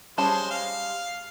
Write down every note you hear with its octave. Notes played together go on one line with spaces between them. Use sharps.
G3 G#3 C#4 C5 A5
F5